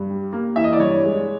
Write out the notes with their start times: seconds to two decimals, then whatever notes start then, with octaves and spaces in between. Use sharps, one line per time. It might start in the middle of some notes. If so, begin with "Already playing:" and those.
Already playing: G2
0.10 G3
0.33 A#3
0.56 E3 E5
0.64 D#5
0.73 D5
0.80 G2 C#5
1.03 G#3